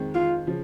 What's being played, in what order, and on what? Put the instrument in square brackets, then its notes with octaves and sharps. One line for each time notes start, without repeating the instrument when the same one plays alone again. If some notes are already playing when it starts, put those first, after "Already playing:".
Already playing: [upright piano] F2 D#3 G#3 C4
[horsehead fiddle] F4
[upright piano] C#3 F3